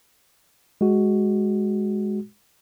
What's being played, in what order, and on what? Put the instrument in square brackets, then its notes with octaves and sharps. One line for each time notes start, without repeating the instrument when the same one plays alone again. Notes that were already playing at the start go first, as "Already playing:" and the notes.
[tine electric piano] G#3 F#4